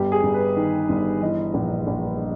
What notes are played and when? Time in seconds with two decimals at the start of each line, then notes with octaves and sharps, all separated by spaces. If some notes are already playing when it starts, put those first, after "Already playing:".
Already playing: G1 G4
0.12 G#4
0.23 G1
0.34 B4
0.56 D#3
0.89 G1
1.21 E3 D#5
1.54 A#1
1.87 A#1